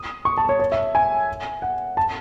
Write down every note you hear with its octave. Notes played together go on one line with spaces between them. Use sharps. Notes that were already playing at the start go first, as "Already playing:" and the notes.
Already playing: D#6
C#6
A5
C#5
C#5
E5
G#5
F#5
A5